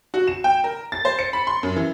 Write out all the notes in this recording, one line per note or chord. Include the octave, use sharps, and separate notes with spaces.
F#4
E7
G5
A#4
A6
C5
C#7
B5
C6
F#2
E3